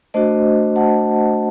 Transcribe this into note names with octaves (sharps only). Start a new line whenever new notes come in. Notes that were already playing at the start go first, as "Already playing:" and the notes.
A3 D4 F#4 C5 D#5
F#5 A5